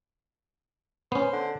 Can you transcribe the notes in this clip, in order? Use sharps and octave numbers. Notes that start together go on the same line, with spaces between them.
B3 C#4 C5
D3